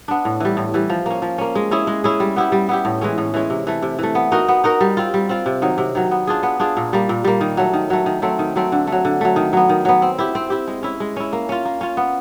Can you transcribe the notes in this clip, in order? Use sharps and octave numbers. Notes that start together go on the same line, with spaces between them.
B3 D4
A2
E3 G3
A2
E3 G3
F3
A#3 C#4
F3
A#3 C#4
G#3
C#4 E4 G#4
G#3
C#4 E4 G#4
G3
B3 E4 G4
G3
B3 E4 G4
A2
E3 G#3 C#4
A2
E3 G#3 C#4
C3
E3 A3
C3
E3 A3
B3
D#4 F#4 A#4
B3
D#4 F#4 A#4
G3
C4 F4
G3
C4 F4
C3
D#3 F#3
C3
D#3 F#3
B3
D4 F4 G#4
B3
D4 F4 G#4
A#2
G3 A#3
A#2
G3 A#3
D#3
F#3 A3
D#3
F#3 A3
D#3
F#3 A3 C4
D#3
F#3 A3 C4
D3
F#3 A3
D3
F#3 A3
D#3
F#3 B3
D#3
F#3 B3
C4
E4 G4
C4
E4 G4
G#3
C#4 E4
G#3
C#4 E4
A#3
C#4 F4
A#3
C#4 F4
B3